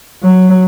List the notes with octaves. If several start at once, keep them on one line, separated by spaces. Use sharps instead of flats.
F#3